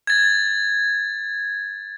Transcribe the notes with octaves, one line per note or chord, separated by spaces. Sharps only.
G#6 A6